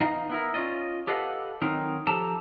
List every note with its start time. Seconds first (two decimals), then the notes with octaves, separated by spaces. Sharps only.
0.01 E2 D#4 D#5 F5
0.29 B3 E4 A#4
0.54 C#4 F4 D5 D#5
1.07 G4 A4 B4 D#5 F5 F#5
1.62 D#3 F#3 C4 D#4 A#4
2.07 F3 G4 A4 A5 A#5